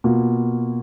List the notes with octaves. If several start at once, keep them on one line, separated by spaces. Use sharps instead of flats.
B2 A#3 F4